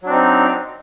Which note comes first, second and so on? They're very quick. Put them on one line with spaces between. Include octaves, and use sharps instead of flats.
F#3 D4 C4 D#4